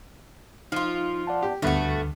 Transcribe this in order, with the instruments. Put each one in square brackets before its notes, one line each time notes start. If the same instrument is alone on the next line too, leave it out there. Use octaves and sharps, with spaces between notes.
[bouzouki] F3 F4 [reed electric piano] D#4
[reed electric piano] D5 F#5 A5
[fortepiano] G4
[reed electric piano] D2 D3 [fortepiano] G2 B3 [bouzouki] A3 F#4